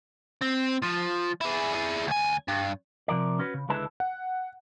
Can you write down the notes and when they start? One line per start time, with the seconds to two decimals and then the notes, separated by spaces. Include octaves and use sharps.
0.41 C4
0.82 F3
1.41 E4 G#4
1.74 E4 G#4
2.07 D2 G#5
2.48 G2
3.08 C3 F3 A#4 D5
3.39 C#4 F#4 B4
3.54 C#3
3.69 C#2 D3 G#3 E4 B4 A5
4.00 F#5